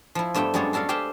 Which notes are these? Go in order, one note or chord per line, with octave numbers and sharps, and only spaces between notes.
F3 E4
G2 A3 B3 E5 G5
F#2 G3 G#3 B3 A4 C#5
D4 F#4 A4 D5 F5
G4 G#4 C5 E5 F5 G5